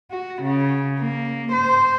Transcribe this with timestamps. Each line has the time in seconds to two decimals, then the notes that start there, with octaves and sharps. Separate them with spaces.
0.11 F#4
0.42 C#3
1.00 A#3
1.52 C5